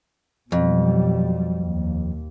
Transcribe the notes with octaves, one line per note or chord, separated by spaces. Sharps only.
F2 B2 F#3 G3
D#2